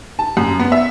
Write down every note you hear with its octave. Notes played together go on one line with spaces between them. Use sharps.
A5
F#2
B3
E5